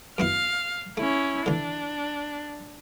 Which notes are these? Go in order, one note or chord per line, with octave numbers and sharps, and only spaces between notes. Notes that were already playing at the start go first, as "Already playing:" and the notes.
F#2 B3 E4 F5
A3 C#4 E4
D3 E3 D4